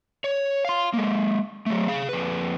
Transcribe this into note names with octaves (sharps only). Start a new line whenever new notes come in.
C#5
F5 C6
G#3 A#3
F#3 A3
G#4 F5
F2 B4